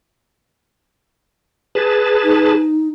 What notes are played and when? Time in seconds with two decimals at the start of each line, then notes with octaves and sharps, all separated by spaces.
1.75 G#4 B4 A5
2.23 D#4